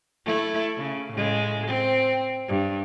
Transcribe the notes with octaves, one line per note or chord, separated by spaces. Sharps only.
A3 E4
C#3
A2 C#3 G#3
C4
G2